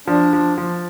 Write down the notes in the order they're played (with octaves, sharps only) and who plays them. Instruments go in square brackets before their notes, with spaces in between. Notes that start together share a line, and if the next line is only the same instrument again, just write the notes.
[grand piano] F3 [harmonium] D4
[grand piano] F3
F3